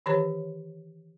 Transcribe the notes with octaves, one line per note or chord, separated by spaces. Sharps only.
D#3 E3 G4 B4 C#5 A#5